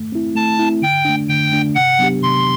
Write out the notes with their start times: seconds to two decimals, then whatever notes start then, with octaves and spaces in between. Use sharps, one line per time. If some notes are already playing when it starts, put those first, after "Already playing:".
Already playing: A3
0.12 C4 E4
0.35 A3 A5
0.59 C4 E4
0.82 D3 G5
1.05 A3 D4
1.29 D3 G5
1.52 A3 D4
1.75 C3 F#5
1.99 F#3 B3 D4 G4
2.22 C3 C6